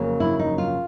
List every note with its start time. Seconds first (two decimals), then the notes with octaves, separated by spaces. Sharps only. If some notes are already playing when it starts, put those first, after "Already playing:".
Already playing: F2 C#3 F#3 A#3
0.20 E4
0.39 D#4
0.58 F4